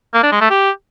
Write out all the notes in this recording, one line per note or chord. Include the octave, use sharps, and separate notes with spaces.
A#3
D4
G#3
A3
G4